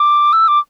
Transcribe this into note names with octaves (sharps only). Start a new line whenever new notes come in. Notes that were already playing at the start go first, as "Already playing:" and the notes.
Already playing: D6
E6
D6